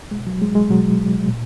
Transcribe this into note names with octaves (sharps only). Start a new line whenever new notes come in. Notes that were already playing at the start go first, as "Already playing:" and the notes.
B2 G#3
F#3
G#3
G#3
B2 F#3
A#2